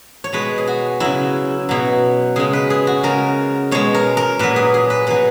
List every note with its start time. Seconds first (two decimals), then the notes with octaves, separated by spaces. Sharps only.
0.24 C#5
0.33 B2 G#3 B4
0.58 G#4
0.67 F#4
1.00 C#3 F#3 E4
1.69 B2 F#3
2.36 C#3 G#3 G#4
2.53 B4
2.70 G#4
2.87 F#4
3.03 C#3 G#3 A#4
3.71 B2 G#3 C#5
3.94 A#4
4.17 A#4
4.39 A#2 F#3 B4
4.56 G#4
4.74 G#4
4.90 B4
5.07 B2 F#3 B4